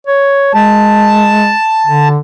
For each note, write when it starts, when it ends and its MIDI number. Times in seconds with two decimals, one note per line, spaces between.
0.07 0.50 73
0.54 1.52 56
0.54 2.08 81
1.86 2.17 50